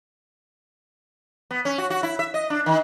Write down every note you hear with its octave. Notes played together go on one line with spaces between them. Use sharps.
B3
C#4
F#4
F#4
E4
E5
D#5
D4
D#3